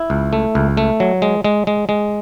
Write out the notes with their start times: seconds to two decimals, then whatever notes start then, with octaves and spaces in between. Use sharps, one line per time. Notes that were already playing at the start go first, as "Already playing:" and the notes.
Already playing: E4
0.10 C#2
0.33 A3
0.55 C#2
0.77 A3
1.00 F#3
1.22 G#3
1.44 G#3
1.67 G#3
1.89 G#3